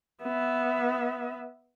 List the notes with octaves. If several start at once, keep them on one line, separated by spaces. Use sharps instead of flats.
B3 E5